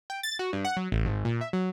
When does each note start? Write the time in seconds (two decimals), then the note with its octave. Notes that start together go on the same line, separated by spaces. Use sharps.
0.10 G5
0.23 A6
0.39 F#4
0.53 G2
0.65 F#5
0.77 F#3
0.92 A1
1.06 G#1
1.25 A#2
1.41 E5
1.53 F#3